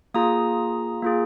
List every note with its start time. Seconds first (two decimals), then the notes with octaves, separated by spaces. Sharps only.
0.14 A#3 F4 G#4 A#5 D#6
1.02 A#3 F4 G#4